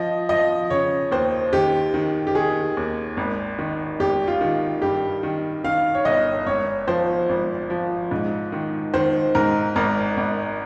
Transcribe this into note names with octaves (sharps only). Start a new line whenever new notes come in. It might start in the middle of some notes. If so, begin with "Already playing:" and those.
Already playing: F3 D#5
F3 D#5
C#3 C#5
D#2 C5
D#3 G4
D#3
G4
D#3 G#4
D#2
G#1
D#3
G#1 G4
F4
D#3
G2 G4
D#3
D#3 F5
C#5
G1 D#5
G#1 C#5
F3 C5
G#1
F3
G#2
D#3
D#3 C5
G#2 A#4
G#1 A#4
G#1